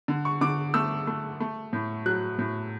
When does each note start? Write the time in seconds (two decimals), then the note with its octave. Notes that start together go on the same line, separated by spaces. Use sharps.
0.08 D3
0.25 C#6
0.41 D3 D6
0.74 A3 E6
1.07 A3
1.40 A3
1.73 A2
2.06 F#3 F#6
2.39 A2